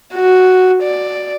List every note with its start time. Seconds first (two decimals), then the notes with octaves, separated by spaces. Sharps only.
0.14 F#4
0.83 D5